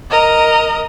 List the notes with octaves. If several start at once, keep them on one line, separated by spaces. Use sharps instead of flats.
A#4 D#5